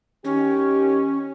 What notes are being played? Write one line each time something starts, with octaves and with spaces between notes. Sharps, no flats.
D#3 C#4 G4